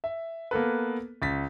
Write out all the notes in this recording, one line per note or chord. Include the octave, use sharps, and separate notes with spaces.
E5
A#3 B3 A4 B4
C#2 A6 B6